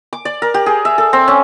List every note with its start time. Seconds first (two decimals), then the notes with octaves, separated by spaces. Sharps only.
0.13 D6
0.25 D5
0.42 A#4
0.54 G4
0.66 G#4
0.85 E5
0.98 A4
1.13 C4
1.28 C#4